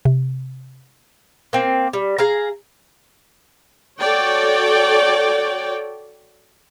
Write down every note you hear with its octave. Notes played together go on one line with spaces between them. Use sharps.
C3
A#3 C4
G3
G#4 F5 A#5
F#4 A4 C#5 D5 G5